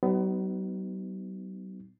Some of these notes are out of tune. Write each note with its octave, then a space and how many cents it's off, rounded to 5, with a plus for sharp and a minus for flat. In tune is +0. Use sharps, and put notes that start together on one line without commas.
F#3 +45 B3 +25 D#4 +0